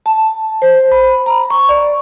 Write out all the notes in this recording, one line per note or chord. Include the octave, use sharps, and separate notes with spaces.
A5
C5
B5
A#5
C#6
D5